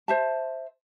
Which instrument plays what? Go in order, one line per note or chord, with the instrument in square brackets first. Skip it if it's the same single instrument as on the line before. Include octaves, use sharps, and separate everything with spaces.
[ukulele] C5 E5 A5